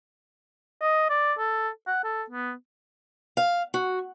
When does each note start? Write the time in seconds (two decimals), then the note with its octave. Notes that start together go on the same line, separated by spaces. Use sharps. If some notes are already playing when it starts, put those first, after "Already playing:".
0.82 D#5
1.10 D5
1.38 A4
1.87 F#5
2.04 A4
2.30 B3
3.37 F5
3.74 F#4